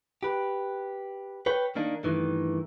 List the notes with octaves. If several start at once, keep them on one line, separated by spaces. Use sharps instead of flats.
G4 B4
B4 C#5 G5
D#3 A#3 D4 D#4
G2 D#3 E3 A3